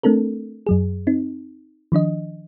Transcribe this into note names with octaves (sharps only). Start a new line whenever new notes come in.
A3 C4 D4 A4 A#4
F#2 F#3 G#4
C4 D#4
D#3 F3 D4 D#5